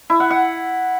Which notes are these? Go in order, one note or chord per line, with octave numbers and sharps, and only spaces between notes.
E4
F#5
F#5